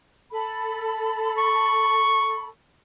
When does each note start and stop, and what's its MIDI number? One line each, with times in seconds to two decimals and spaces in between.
0.31 2.48 69
0.31 2.48 83
1.38 2.47 85